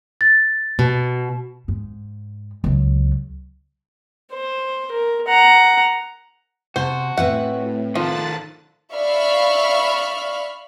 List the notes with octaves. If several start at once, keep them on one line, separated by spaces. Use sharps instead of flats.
A6
B2
G#2
C#2 F#3
C5
A#4
F#5 A#5
C3 F#4 C5 A5
A2 C4 B4 E5 F#5
D#3 F3 A4 A5 F#6 A6
D5 E5 F5 B5 C#6 F6